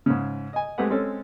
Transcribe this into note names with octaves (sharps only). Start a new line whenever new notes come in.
G#2 C#3
D#5 G#5
G#3 A3 C4 G4 B4 F#5
G#3 C4 C#4 A4